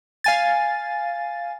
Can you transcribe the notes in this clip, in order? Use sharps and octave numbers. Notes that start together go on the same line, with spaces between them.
F5 G#5 A6